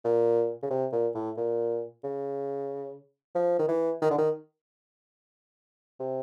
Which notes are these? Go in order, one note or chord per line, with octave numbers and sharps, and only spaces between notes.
A#2
C#3
C3
A#2
A2
A#2
C#3
F3
D#3
E3
D#3
D3
D#3
C3